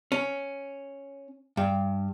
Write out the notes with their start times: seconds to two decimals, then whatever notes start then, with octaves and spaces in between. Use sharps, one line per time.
0.12 C#4
1.57 G2